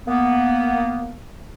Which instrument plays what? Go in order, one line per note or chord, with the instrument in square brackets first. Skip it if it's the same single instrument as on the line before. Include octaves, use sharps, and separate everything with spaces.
[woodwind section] A#3 B3